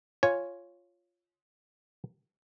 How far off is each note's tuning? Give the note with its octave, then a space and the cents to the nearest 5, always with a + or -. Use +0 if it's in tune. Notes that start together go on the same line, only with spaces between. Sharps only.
F4 +0 C#5 +0 G#5 +0